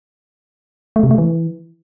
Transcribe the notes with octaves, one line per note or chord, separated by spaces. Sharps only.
A3
C3
A3
E3